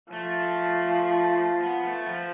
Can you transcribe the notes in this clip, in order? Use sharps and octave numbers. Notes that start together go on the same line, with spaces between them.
F3 A3
B3
A3
F3